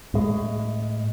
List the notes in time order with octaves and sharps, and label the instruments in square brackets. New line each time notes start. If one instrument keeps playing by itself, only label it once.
[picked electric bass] A2 G#3